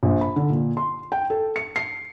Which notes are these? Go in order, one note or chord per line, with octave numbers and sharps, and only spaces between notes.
A#1
B5
D3
A#2
C6
G5
A4
C#7
C7